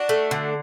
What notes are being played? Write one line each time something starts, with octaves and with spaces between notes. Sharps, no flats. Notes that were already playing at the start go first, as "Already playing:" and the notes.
Already playing: D4 F#4
A3
D3